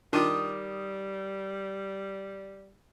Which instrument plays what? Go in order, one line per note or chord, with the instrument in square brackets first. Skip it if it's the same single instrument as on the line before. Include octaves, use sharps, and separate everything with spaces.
[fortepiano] D#3 [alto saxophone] G3 [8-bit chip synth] D4 F4 [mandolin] D6 D#6